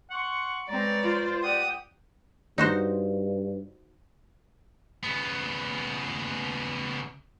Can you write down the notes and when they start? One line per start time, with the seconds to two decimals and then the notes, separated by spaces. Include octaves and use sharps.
0.11 F#5 C6 C#6
0.69 G#3 C4 B4 C#5 D5 A#5
1.03 F4 C5
1.43 G4 D5 F#5 D#6
2.58 G2 D#4 F#4 C5
5.03 C#3 B3